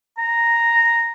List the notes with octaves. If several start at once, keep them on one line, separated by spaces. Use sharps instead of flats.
A#5